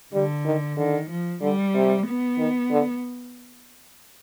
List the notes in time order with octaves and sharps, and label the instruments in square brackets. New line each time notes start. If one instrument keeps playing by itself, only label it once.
[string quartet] D3 [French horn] G3
[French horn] D#3
[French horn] D3 [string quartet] D#3
[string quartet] F3
[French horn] D3 [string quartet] G3
[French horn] C3
[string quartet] B3
[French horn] D#3
D3